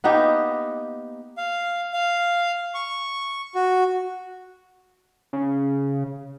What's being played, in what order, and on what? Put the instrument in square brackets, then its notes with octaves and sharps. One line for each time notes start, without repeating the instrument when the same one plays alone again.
[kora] A#3 B3 D#4 G4
[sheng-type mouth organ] F5
F5
C#6
F#4
[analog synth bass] C#3